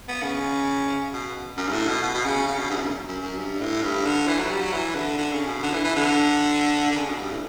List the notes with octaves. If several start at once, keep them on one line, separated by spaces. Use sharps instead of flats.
B3
C#3
B2
F#2
G2
A2
B2
B2
B2
C#3
C#3
B2
G2
E2
F#2
F#2
F#2
G2
A2
G2
D3
E3
F#3
G3
F#3
E3
D3
D3
C#3
B2
D3
E3
E3
D3
D3
C#3
B2
G2
A2